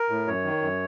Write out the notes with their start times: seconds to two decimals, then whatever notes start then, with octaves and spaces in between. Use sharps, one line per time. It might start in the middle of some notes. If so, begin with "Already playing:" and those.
Already playing: A#4
0.10 A2
0.27 F#2 C#5
0.45 D#3
0.61 F#2